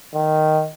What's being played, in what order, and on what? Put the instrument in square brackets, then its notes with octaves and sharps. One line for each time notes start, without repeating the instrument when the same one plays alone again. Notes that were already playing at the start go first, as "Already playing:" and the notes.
[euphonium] D#3